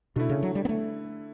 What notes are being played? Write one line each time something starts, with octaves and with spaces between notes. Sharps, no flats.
B2 D3 A3 E4
C#3
F#3
G3
B3
A3